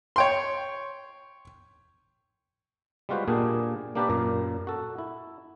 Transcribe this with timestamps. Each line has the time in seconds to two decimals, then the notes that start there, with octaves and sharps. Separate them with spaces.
0.16 C#5 G5 C6
3.09 G3 G#3 F4 F#4 B4 C5
3.28 A#2 A#3 D4 G4 G#4
3.95 A#3 D4 G4 A#4 B4 D5
4.09 F#2 A#2 A#4
4.67 F#4 A4
4.99 E4